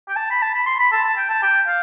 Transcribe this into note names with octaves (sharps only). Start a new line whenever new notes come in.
G5
A5
B5
A5
B5
C6
B5
A5
A5
G5
A5
G5
F5